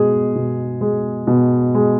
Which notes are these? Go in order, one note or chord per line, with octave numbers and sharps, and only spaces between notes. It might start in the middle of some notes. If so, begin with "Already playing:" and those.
Already playing: B2 G#3 G#4
B2
G#3
B2
G#3